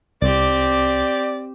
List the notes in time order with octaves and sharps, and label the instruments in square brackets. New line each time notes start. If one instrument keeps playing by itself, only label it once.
[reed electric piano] C2 [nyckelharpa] C4 G4 [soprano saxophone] D5